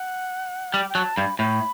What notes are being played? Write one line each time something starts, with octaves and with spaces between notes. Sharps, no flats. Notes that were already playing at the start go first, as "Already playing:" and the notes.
Already playing: F#5
G3 G5
G5
F#3 A5
G2 B5
A2 B5